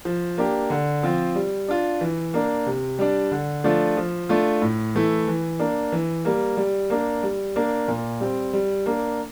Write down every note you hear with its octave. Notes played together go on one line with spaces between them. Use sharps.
F3
A#3 D4 G4
D3
F3 C4 F4
G3
D4 F4
E3
A#3 D4
C3
G3 D4
D3
F3 A3 D4 F4
F3
A3 D4 F4
A2
E3 A3 E4
E3
A#3 D4
E3
G3 A#3
G3
A#3 D4
G3
A#3 D4
A#2
G3 C4
G3
A#3 D4